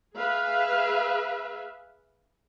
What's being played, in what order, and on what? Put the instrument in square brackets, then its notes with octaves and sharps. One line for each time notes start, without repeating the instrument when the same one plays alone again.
[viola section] G#4 B4 E5 F5